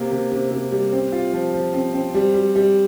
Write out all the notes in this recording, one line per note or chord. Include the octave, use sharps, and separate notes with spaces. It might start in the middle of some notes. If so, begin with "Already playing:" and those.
Already playing: C3 A#3
C3
C3
C3
G3
C4
F4
F3
F3
C4
C4
G3
G3
G3